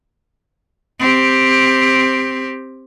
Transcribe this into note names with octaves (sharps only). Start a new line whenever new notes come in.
C4 G4